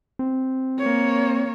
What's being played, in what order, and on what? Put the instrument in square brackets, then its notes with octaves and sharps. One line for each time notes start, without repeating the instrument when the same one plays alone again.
[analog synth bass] C4
[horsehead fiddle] A#3 C#5